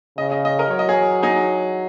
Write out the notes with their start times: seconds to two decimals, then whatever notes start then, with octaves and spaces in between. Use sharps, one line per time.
0.17 C#3 D#5
0.32 D#5
0.45 D#5
0.59 A#4 D#5
0.70 F#3 C#5
0.79 D#5
0.88 G#4 C#5
1.22 D#4 G#4